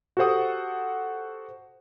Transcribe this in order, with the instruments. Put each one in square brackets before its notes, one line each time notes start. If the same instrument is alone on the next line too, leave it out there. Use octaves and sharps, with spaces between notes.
[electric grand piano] F#4 G4 A4 C5 F#5 D#6